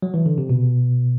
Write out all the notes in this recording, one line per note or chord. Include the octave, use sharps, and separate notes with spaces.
F#3
E3
D3
C3
B2